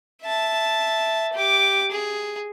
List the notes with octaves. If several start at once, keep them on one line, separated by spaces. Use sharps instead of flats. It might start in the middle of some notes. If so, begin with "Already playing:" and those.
E5 A5
G4 D6
G#4